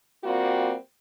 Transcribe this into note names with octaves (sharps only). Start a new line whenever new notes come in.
G3 A#3 C4 F4 F#4